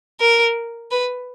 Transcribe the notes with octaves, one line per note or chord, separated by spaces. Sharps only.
A#4
B4